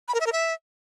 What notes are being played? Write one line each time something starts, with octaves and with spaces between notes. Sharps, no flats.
B5
A#4
E5
A#4
E5